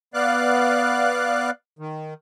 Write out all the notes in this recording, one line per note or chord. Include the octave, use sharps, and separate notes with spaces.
B3 D5 F5 F#6
D#3